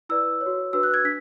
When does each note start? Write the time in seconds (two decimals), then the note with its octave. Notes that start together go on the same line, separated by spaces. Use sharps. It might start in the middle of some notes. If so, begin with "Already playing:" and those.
0.09 E4 B4 D5 E6
0.41 C#5
0.46 F#4
0.73 D4 F#4 B4 E6
0.83 F#6
0.94 G#6
1.04 D4 B6